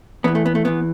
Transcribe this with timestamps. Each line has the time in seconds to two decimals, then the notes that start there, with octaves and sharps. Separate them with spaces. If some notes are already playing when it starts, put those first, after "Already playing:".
0.24 E2 E3 B3
0.35 A3
0.46 B3
0.55 A3
0.65 E2 E3 B3